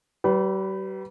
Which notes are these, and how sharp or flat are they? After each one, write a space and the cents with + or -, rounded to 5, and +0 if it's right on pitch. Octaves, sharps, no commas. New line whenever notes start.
G3 -40 B4 +5